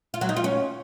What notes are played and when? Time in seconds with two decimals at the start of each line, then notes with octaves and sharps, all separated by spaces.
0.14 F4
0.21 F#3
0.29 D#4
0.37 F4
0.44 C#4